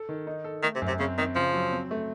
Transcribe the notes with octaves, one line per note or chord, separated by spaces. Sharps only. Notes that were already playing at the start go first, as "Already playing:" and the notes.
Already playing: A4
D#3
D#4
A4
D#3 A3
C3
F#2
C3
C#3 C4
D#3 C4
C#3 F3
F#3
C4
A3